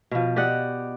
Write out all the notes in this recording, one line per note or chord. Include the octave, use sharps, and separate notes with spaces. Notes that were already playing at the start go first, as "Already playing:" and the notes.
B2 F3
G4 D5 D#5 F#5